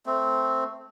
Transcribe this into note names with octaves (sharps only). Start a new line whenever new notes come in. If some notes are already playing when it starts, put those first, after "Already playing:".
A3 C4